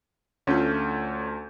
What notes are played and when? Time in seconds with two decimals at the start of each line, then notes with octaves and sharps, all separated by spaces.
0.47 D2 A3 C#4 F4 G6